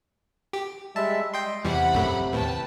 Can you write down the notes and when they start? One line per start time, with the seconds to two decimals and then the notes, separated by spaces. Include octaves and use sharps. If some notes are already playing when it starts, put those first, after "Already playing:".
0.53 G4
0.96 G3 G#3 E5 A5
1.34 D#5 G5 C6
1.64 E2 C3 E3 G3 F#5 B5
1.93 A#1 F#2 A3
2.32 D#2 A2 B4 G5 A5